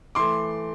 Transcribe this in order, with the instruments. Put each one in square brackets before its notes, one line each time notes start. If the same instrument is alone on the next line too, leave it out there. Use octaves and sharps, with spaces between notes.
[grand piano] E3 A3 C6 D6